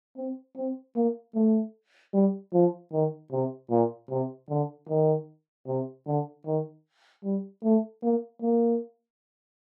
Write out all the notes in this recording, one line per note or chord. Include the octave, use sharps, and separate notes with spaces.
C4
C4
A#3
A3
G3
F3
D#3
C3
A#2
C3
D3
D#3
C3
D3
D#3
G3
A3
A#3
A#3